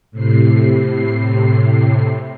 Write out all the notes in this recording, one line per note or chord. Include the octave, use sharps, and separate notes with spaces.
A2 C3 C7